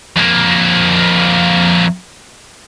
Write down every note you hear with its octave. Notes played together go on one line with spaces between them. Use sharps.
F2 A#3